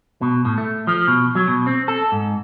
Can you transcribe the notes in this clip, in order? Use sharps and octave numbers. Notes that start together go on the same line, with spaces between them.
B2
A2
A3
F3
B2
F#3
B2
C4
A4
G#2